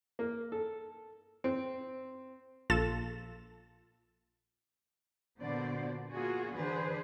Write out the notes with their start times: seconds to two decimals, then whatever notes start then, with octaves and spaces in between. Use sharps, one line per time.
0.19 A#3
0.52 A4
1.44 C4
2.70 A#1 F4 A4 A6 E7
5.41 A#2 D3 B3 F#4 C5 D5
6.10 A#3 F4 F#4 G#4
6.54 D3 E3 D4 G#4 B4 C5